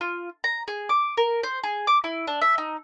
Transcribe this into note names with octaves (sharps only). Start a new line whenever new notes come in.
F4
A#5
G#4
D6
A#4
C5
G#4
D6
E4
D4
E5
D#4